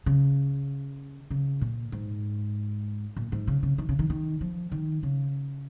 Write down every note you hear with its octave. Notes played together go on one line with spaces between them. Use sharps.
C#3
C#3
A#2
G#2
A#2
G#2
C#3
C#3
D#3
C#3
D#3
D#3
F3
D#3
C#3